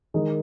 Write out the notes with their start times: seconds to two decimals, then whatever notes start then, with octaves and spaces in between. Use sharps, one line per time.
0.14 D#3 G#3 D#4